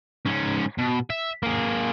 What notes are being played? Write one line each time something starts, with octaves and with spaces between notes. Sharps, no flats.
G#2 C#4
B2
E5
A#3 G#4